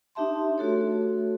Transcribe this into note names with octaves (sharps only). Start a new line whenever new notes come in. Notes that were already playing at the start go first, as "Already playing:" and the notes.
D4 D#4 G4 E5 A5 C6
A3 F#4 A4 C#5